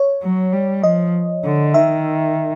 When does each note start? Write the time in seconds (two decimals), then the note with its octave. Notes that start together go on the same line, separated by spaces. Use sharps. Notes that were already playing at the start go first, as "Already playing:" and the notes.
Already playing: C#5
0.22 F#3
0.53 G3
0.83 F3 D#5
1.44 D3
1.74 D#3 E5